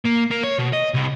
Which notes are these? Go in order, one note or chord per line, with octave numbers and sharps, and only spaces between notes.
A#3
A#3
C#5
B2
D#5
C2